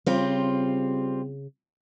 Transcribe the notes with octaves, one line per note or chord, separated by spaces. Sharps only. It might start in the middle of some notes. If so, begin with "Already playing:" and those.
C#3 G3 C4 F4